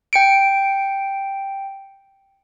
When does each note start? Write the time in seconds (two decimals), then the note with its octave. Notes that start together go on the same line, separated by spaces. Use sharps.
0.13 G5 C#7 D7